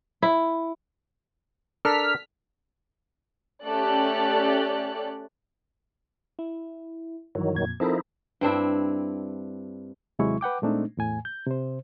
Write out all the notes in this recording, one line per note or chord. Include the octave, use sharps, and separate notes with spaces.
E4
D4 A4 A#4 F6 B6
A3 C#4 G4 A4 D5 F#6
E4
G2 D#3 E3 F#3
F2 A#2 G#6
F3 C4 D#4 E4 A4 A#4
G2 C4 D4 E4
D#2 C3 F#3 G#3 E4 C#6
B4 F#5 G5 D6
A#2 G#3 A3 C4 D4 D#4
E2 A2 G#5
G6
C3 C5